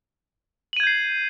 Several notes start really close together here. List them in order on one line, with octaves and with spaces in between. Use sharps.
F#7 D#7 G#6 G6 C7